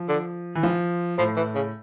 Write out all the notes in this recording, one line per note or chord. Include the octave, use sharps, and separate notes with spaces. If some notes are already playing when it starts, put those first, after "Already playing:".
Already playing: F3
D3
E3
F3
A2 F3
E3
C#3